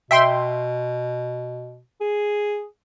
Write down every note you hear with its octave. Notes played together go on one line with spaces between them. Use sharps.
B2 E5 G5 C6
G#4